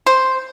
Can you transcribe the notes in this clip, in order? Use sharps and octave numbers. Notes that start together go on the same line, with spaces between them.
C5